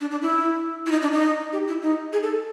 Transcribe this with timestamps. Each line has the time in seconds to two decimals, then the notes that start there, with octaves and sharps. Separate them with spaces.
0.01 D4
0.11 D4
0.22 E4
0.86 E4
0.92 D#4
1.02 D4
1.12 D#4
1.53 G4
1.68 E4
1.83 D#4
2.13 G#4
2.23 A4